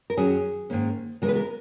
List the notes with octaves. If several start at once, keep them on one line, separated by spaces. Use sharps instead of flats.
A#4
F#2 D#3 F#3 C#4 G#4
G#2 D#3 A#3 C#4
C#3 E3 G#3 B3 A#4
B4
A#4